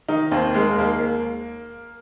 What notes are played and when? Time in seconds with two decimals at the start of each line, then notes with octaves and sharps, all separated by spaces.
0.08 D#3 D#4
0.32 D#2 C4
0.55 G#3 A#3
0.78 D#2 A#3